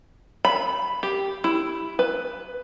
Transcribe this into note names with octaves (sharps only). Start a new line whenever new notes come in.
B5
G4
E4
B4